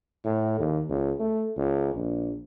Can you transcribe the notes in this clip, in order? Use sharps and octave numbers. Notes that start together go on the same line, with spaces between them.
A2
D#2
C#2
A3
C#2
A#1